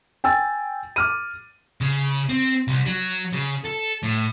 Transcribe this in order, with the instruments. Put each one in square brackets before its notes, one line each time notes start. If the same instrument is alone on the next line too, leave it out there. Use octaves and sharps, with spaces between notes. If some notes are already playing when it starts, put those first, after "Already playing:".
[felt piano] G5 G#5 E6 A6
D6 F6 D#7
[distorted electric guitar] C#3
C4
C2
F#3
C#3
A4
A2